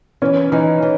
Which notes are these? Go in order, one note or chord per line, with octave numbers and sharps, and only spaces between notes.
E3 C#4
E3 D#4
E3